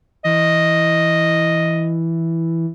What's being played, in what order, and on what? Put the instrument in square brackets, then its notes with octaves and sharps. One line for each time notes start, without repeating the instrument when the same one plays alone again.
[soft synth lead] E3 [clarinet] D#5